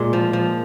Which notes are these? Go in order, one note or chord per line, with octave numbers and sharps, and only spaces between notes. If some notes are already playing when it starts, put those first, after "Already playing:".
Already playing: A#2 G#3
F3
F3